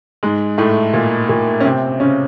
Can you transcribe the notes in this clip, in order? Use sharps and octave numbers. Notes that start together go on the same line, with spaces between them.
G#2 G#3
A2 A3
A#2 A#3
A#2 A#3
C#4
C3 C4
C#3 C#4